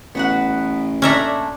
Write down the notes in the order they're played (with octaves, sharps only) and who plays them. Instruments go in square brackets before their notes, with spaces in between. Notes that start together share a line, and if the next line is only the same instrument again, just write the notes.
[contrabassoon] A1 [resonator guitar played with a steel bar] B3 F#4 F#5
[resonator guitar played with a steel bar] A#2 A3 D4 [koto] C#4 E5 A#5